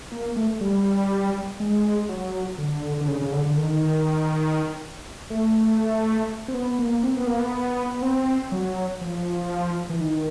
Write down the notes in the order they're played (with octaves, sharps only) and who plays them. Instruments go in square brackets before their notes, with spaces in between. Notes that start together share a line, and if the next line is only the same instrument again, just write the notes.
[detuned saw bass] A#3
A3
G3
G#3
F#3
D3
D3
C#3
C#3
D3
D3
D#3
A3
C4
B3
A#3
C4
B3
A#3
B3
B3
C4
F#3
F3
E3
D#3